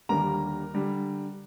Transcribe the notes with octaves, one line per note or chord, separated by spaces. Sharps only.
D#2 D3 G3 A#3 A#4 A#5
D3 G3